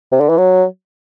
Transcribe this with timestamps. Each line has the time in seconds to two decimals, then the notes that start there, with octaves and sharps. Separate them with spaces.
0.12 C3
0.20 D3
0.29 E3
0.37 F#3